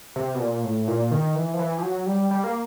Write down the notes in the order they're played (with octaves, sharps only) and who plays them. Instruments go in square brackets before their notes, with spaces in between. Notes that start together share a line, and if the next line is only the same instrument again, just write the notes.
[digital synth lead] C3
B2
A#2
A2
A#2
D#3
E3
F3
E3
F3
F#3
G3
G3
A#3